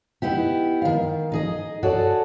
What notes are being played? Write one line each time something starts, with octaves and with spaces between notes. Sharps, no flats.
B3 D#4 E4 G4
D#3 F5
D#4 G#4 D#5
F#4 G#4 A4 C#5 D5